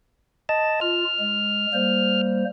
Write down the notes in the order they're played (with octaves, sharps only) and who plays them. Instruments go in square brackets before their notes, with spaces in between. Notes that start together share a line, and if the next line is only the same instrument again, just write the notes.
[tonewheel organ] D#5 A5
[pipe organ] F4 [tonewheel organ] F6
[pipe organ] G#3
G3 A#3 C5